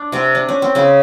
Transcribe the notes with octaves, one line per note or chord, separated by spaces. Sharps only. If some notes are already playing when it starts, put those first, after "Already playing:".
Already playing: D4
C3 C4
D4
C#4
C4
C#3 C#4